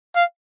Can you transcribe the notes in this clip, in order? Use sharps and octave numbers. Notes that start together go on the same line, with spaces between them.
F5